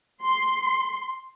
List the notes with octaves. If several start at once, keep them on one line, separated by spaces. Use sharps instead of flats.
C6